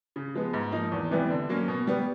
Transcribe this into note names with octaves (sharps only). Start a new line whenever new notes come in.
C#3
F3 G#3 B3
G#2
F3 A#3 D#4
E2
C3 E3 G3 B3
D3
F#3 A#3 C#4
B2
G3 B3